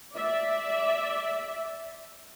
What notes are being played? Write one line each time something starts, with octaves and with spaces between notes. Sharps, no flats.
D5 E5